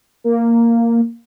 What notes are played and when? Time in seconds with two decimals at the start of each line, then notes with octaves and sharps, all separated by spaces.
0.24 A#3